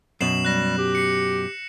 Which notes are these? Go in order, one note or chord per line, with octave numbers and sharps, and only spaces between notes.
F#2 B2 C7 E7 F#7
G3 F#6 A#6
G4
C7 C#7